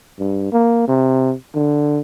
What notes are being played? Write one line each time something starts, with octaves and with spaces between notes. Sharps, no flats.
G2
A#3
C3
D3